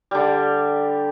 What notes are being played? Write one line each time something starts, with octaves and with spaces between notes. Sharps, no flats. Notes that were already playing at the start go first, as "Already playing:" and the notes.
D3 G3